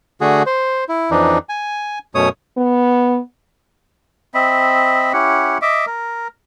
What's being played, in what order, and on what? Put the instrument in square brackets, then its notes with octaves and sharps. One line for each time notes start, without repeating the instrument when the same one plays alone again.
[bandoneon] D3 A3 F#4 G#4
C5
E4
F2 E3 D4 D#4
G#5
F#2 B2 A3 C#5 D#6
[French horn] B3
[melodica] C4 D#5 E5 B5
C#4 E4 G4 F#5
D#5 E5 D6
A#4